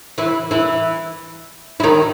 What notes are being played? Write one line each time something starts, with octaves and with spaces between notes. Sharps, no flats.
E3 E4
E3 E4
E4
D#3 D#4